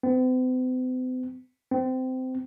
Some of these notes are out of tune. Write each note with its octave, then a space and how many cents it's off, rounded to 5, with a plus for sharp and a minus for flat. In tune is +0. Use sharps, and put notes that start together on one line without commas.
C4 -45
C4 -20